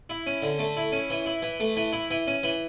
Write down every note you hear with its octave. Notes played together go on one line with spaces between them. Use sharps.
E4
C#4
D3
A3
E4
C#4
E3
E4
E3
A3
E3
E4
E3
C#4
E3